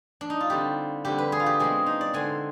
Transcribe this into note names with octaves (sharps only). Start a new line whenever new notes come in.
D4
D#4
F4
D3 G3 C4 G4
D3 G3 C4 G4
B4
G#4
F4
G4
B2 G#3 C4 G#4
D#4
D5
D3 G#3 C4 G#5